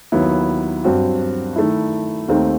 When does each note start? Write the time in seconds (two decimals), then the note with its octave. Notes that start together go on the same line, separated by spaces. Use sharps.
0.12 D#2 D#3 F#3 B3 E4
0.84 G2 F#3 C4 F#4
1.56 D#3 A3 E4
2.28 D#2 D#3 A3 C4 D#4